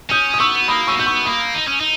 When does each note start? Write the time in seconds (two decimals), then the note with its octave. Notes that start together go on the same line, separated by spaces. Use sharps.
0.10 C#4 D#6 G6
0.34 D#6
0.40 B3 C#6 E6
0.68 A#3 B5 D#6
0.87 C#4 C#6 E6
0.97 B3 G6
1.06 C#6 E6
1.25 A#3 B5 D#6
1.54 D#4
1.67 C#4
1.80 D#4